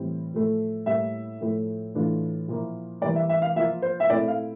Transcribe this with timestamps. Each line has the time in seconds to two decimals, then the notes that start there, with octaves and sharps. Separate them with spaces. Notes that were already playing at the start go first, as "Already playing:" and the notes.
Already playing: A2 E3 G3 C4 E4
0.33 A2 F3 A3
0.86 A2 G3 A#3 E4 E5
1.41 A2 F3 A3
1.94 A2 E3 A3 D4 F4
2.48 A#2 F3 A#3 E4
3.01 E3 G3 A#3 D5
3.15 E5
3.29 E5
3.42 F5
3.56 F3 A#3 F4 E5
3.82 C5
4.00 E5
4.09 A#2 A3 C4 E4 D5
4.28 F5